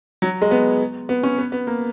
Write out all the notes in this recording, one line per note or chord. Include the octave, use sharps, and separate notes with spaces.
F#3
G#3
B3
B3
C#4
B3
B3
A#3